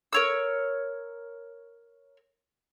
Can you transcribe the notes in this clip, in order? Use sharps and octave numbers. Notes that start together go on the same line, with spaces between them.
A#4 C#5 E6